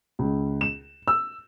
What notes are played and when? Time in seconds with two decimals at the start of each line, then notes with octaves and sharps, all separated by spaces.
0.19 C#2
0.61 E7
1.08 E6